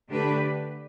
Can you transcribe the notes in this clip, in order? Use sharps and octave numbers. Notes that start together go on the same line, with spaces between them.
D3 A3 D4 G4 B4